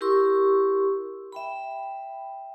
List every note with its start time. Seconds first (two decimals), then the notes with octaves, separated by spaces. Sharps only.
0.01 E4 G4 A#4 C6 C#6 E6
1.32 E5 G5 B5